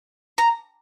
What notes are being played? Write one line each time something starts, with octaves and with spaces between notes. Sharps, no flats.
A#5